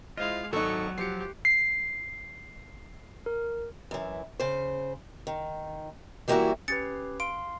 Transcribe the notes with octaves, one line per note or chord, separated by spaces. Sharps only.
G#3 E4 F4 C5 D#5 F5
G#1 F#3 D#4 A4 C#6 F#6
F3 G4 C7 C#7
C7
A#4
F#2 E3
C#3 C5
D#3
E3 G3 A#3 D#4 E4 F#4
C#4 G4 B4 A6 C#7
F5 C6 D7